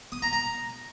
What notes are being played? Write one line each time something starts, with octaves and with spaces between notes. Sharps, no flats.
D#6
A#5
A#5